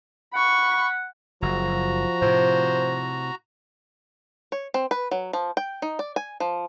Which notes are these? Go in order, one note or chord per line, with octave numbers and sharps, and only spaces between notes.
F#5 B5 C#6
F#1 F3 F#4 A#5
A2 C3 C5
C#5
C4
B4
F#3
F3
G5
D#4
D5
G#5
F3